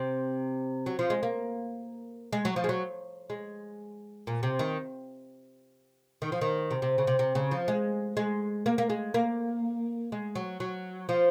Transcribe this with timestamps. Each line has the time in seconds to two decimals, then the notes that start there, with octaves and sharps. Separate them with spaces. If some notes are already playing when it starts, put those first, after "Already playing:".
Already playing: C3
0.86 F#3
0.99 F3
1.10 G#3
1.23 A#3
2.33 G#3
2.45 F#3
2.56 F3
2.64 G#3
2.69 F#3
3.30 G#3
4.27 A#2
4.43 C3
4.59 D#3
6.22 D#3
6.32 F3
6.41 D#3
6.71 C3
6.82 C3
6.98 C#3
7.07 C3
7.19 C3
7.35 C#3
7.51 F3
7.68 G#3
8.17 G#3
8.66 A#3
8.78 A#3
8.90 G#3
9.14 A#3
10.12 G#3
10.35 F#3
10.60 F#3
11.09 F3